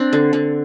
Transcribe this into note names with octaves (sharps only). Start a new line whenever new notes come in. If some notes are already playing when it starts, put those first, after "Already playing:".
Already playing: C4 D4
D3
D3